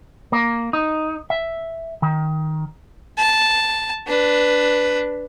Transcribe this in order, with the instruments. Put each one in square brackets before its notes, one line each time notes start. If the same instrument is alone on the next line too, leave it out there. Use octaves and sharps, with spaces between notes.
[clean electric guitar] A#3
D#4
E5
D#3
[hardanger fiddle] A5
D4 B4